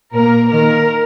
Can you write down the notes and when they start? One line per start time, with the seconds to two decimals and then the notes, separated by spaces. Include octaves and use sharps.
0.14 A#2 A#3 A#4
0.51 D#3 A#3 A#4